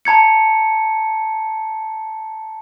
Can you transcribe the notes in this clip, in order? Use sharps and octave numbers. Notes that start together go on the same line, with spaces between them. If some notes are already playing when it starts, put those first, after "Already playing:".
A5 A#5 G#6 C#7